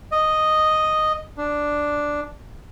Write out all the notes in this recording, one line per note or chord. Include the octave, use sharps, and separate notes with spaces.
D#5
D4